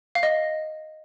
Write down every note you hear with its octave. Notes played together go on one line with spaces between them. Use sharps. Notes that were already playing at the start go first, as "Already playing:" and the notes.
F5
D#5